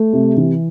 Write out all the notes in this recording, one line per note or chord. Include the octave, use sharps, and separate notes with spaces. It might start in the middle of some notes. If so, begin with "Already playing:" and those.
Already playing: A3
C3
E3